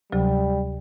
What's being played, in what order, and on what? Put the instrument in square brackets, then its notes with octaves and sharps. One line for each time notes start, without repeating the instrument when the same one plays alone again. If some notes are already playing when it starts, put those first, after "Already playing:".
[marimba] D2 C3 F#3 [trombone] G3